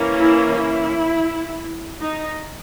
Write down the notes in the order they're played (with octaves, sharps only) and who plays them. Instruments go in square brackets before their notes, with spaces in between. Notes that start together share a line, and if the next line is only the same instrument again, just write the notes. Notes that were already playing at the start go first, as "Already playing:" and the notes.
Already playing: [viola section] E3 A#3 C#4
E4
E4
D#4